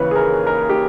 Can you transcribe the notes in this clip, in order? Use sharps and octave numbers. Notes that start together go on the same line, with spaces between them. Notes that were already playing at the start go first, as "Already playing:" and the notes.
Already playing: D#2 C#3 E3 B4 C#5
G#4
A#4
A#4
G4